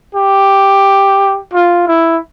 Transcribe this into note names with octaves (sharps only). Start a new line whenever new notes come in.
G4
F4
E4